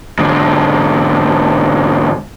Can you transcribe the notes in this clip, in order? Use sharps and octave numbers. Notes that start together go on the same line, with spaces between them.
G#2 D3